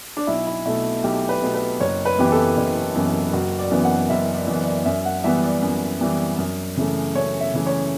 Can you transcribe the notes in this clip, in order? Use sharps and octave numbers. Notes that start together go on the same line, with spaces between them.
D4
B1 E4
E4
B2 A3 E4
B1 G4
B4
B2 A3
B4
F#1 C#5
B4
F#2 E3 B3 G4
A4
F#1
F#2 E3 B3
F#1 F#4
D5
F#2 E3 B3
F#5
F#1 E5
D5
F#2 E3 B3
D5
F#2 E5
F#5
E3 G3 B3 E5
D5
F#2
E3 G3 B3
F#2
C#3 E3 A3
F#2 C#5
E5
C#3 E3 A3
C#5